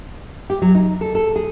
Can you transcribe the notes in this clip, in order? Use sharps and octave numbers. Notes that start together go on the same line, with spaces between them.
G4
F#3
D#4
A4
A4
G#4